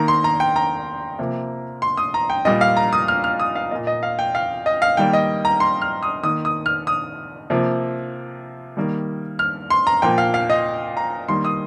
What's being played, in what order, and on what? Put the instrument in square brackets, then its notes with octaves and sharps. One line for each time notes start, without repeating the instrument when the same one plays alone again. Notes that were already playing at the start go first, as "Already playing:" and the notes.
Already playing: [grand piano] D#3 A#3 A#5
C6
A#5
G5
A#5
C3 F3 A#3
C6
D#6
A#5
G5
A#2 G3 A#3 D#5
F5
A#5
D#6
F6
F6
D#6
F5
A#2 A#3 D#5
D#5
F5
G5
F5
D#5
F5
D#3 G3 A#3 G5
D#5
A#5
C6
F6
D#6
D#3 A#3 D#6
D#6
F6
D#6
C3 F3 A#3
D#3 G3 A#3
F6
C6
A#5
A#2 F3 A#3 G5
F5
F5
D#5
A#5
D#3 G3 A#3 C6
D#6